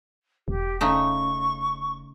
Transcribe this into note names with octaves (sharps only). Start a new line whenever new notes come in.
E1 G4
C#3 A3 D#4 C#6